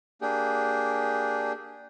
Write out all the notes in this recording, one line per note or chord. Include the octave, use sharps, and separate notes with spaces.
A#3 D4 G4 G#4